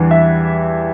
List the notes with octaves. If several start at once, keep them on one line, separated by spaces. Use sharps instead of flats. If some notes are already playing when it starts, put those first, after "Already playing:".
Already playing: E2 E3 G3 D4
E5